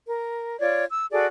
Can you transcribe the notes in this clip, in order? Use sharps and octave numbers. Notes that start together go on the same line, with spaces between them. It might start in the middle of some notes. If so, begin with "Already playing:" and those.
A#4
F4 C#5 D5
E6
F#4 G#4 A4 D5